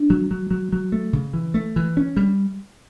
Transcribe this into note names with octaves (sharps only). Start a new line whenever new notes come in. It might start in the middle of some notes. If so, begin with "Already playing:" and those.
Already playing: D4
F#3
F#3
F#3
F#3
A3
C#3
E3
A3
E3
C#4
G3